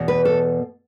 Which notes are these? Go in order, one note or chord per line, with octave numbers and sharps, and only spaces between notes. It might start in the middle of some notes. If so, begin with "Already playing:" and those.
Already playing: E2 B2
B4
A4